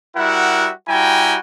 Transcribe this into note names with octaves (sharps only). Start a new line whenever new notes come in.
G3 E4 F#4 A#4 E5 F#5
G3 E4 F#4 G5 G#5 A#5